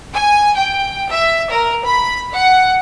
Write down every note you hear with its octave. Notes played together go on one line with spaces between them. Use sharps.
G#5
G5
E5
A#4
B5
F#5